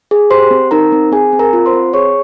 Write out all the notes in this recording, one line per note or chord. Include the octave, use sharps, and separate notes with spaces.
G#4
G4 C5 C6
C4
D#4 A#4 A#5
C4
C4 G#4 G#5
C4
A#4 A#5
F4
C5 C6
C4
G#4 C#5 C#6